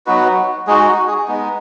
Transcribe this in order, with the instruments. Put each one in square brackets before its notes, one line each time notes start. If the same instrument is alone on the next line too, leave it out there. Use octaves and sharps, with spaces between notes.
[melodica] F#3 B3 D#4 F#4 B4
G#3 D#4 F#4 G#4
F#4
G#4
G#3 B3 D#4